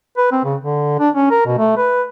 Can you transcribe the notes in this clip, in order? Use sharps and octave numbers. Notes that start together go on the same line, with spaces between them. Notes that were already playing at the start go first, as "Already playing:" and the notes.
B4
C4
C#3
D3
D4
C#4
A#4
B2
A3
B4